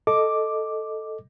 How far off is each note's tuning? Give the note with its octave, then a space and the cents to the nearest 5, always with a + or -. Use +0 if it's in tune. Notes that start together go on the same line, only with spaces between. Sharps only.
A4 +0 D#5 +0 D6 +0